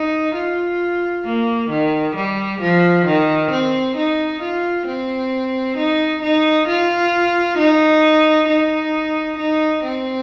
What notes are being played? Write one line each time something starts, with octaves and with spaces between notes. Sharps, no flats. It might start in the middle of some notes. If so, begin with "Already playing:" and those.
Already playing: D#4
F4
A#3
D#3
G3
F3
D#3
C4
D#4
F4
C4
D#4
D#4
F4
D#4
D#4
D#4
C4